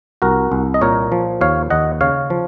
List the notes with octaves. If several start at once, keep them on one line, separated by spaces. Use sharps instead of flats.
C2 F#4 A#4
C2
D#5
A#2 A#4 C#5
F3
D#2 C#5 F5
D#2 D#5 F#5
C#3 C#5 F5
F3